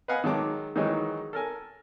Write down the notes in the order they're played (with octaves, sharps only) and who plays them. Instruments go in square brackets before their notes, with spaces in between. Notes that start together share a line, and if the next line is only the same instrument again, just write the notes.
[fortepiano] B4 D#5 F5 F#5 G#5
D#3 F#3 G#3 A5 D6
D#3 E3 F#3 G#3 D#4 F#4
A4 A#4 G#5